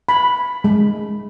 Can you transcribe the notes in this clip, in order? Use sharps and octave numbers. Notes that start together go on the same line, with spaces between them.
B5
G#3